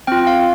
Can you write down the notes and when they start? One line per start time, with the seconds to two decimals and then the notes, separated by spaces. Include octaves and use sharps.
0.07 C4 F4 G5
0.27 F5